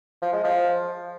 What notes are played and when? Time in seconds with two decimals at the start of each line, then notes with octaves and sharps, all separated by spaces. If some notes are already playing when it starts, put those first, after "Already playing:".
0.22 F3
0.33 G#3
0.44 F3